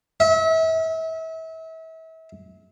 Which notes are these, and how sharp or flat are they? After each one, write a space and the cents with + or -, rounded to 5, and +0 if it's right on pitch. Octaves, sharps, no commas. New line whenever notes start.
E5 -35